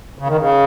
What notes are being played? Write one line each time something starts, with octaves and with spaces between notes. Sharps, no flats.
C#3
D#3
C#3